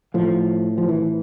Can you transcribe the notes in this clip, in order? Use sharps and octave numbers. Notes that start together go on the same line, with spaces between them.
A2 F3
F3
E3